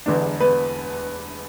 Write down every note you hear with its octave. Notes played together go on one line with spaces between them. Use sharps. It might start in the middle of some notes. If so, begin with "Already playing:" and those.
E1 E2 D3 B3 D4
B3 B4